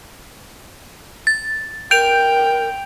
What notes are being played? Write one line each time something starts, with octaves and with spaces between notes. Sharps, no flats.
A6
A#4 G5 G6 D7 F7